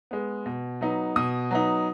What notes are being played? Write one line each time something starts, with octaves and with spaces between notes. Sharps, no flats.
G#3 B3
B2
F#3 B3 D#4
B2 D#6
F#3 B3 D#4